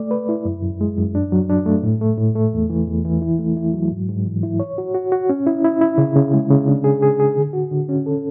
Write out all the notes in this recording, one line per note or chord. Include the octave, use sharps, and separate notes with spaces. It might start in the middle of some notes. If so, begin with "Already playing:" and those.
Already playing: A3 D5
B4
E4
F#2
F#2
G#3
F#2
D4
F#3
D4
A3
A2
A3
A2
A3
E2
E3
E2
E3
E4
A3
E4
F#3
G#2
G#2
E3
E4
C#5
F#4
F#4
F#4
C#4
E4
E4
E4
C#3
C#3
G#3
C#3
D4
G#4
G#4
G#4
D3
F#4
D3
C#4
A4